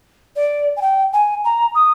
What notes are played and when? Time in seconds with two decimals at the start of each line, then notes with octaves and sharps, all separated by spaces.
0.35 D5
0.76 G#5
0.81 G5
1.13 G#5
1.44 A#5
1.74 D#6